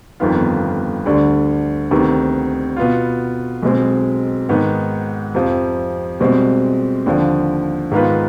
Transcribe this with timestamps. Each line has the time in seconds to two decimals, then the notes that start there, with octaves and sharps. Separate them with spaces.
0.20 G1 F2 D#3 B3 F4
1.06 D2 D3 G3
1.91 D2 C3 D#3 B3
2.77 B2 B3 F4
3.63 B1 B2 G#3 C4
4.49 G#2 D#3 B3
5.34 F2 C3 F3 C4
6.20 C2 B2 G#3 C4
7.06 D#2 D3 F3
7.91 G#2 D#3 B3 F4 B4